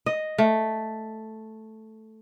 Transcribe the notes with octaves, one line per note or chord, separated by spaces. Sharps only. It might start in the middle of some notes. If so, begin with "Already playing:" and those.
D#5
A3